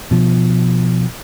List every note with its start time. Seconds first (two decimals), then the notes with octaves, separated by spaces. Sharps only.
0.11 B2 F3